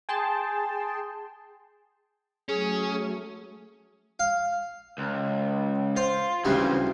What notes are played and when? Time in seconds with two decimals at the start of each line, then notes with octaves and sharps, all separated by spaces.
0.09 G#4 G5 A5 C6
2.49 F#3 A3 C#4 G#4
4.19 F5
4.98 C#2
5.96 F4 C5
6.45 D2 C#3 E3 G3 C4